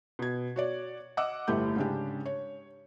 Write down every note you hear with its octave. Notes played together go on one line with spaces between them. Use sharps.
B2 G#6
F#4 C#5 D5
D#5 F#5 D6 E6
G1 A2 A3 G4 G6
G#2 C#3 C#4 D4 G4
C#5